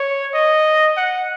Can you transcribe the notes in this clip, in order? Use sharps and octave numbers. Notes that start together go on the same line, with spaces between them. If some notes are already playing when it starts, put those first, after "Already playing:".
Already playing: C#5
D#5
F#5